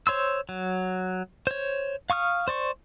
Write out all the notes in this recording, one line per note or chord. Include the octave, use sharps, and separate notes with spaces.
C5 C#5 C6 E6
F#3
C5 C#5
F5 C#6 D#6 F6
C5 D5 C#6